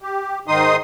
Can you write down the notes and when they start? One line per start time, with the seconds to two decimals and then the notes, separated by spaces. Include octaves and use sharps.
0.02 G4
0.48 G#2 D#3 D#4 C6 D#6